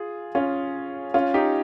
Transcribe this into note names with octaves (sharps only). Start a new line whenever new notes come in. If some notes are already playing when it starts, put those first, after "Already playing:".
Already playing: F4 G#4
C#4 F4
C#4 F4
D#4 G4